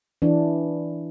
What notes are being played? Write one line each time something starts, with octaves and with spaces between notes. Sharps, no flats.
E3 D4